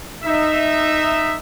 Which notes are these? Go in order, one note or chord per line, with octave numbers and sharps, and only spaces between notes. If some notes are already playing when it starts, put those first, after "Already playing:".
D#4 E5